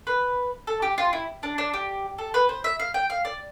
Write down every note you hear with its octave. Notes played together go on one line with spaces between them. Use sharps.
B4
A4
G4
F4
E4
D4
D4
G4
A4
B4
C5
E5
F5
G5
F5
D5